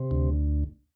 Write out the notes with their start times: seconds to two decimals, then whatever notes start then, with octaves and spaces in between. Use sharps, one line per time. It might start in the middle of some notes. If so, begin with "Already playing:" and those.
Already playing: C3
0.11 D2